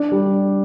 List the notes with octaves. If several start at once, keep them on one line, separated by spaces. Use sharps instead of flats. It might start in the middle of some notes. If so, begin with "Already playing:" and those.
Already playing: D4
G3